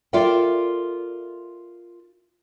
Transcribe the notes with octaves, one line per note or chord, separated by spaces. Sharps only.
F4 A4 A#4 D5 E5 G5